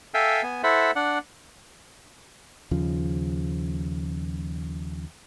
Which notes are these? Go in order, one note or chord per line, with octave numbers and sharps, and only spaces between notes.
A4 E5 F5 G5 G#5
B3 G#5
E4 A4 C5 E5 F#5
D4 F#5
D#2 C#3 F3